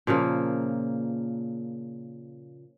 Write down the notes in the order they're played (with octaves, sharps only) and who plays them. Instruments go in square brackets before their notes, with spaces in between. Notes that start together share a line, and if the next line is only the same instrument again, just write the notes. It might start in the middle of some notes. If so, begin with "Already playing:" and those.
[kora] A#2 C#3 F3 A#3